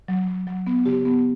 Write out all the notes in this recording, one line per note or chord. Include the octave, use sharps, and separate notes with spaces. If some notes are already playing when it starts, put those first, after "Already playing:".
F#3
F#3
F#3
B3
C#3 G4
B3